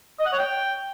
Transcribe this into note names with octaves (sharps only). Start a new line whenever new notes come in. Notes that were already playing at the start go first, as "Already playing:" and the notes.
D#5
F#5
C#5
G5